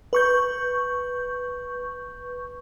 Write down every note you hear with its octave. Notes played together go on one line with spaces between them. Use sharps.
B4 C#6 G6